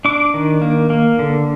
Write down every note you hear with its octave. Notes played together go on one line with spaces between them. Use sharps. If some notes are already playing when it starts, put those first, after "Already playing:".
D4 D6
D#3
A#3
A#3
D3